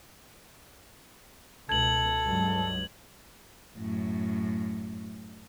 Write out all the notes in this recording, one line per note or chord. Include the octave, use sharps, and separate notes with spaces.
C#2 B2 A4 G#6 F#7
C#2 G2 F#3
F#2 A2